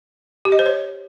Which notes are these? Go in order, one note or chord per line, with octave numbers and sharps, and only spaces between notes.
G4
D#5
C5
C#5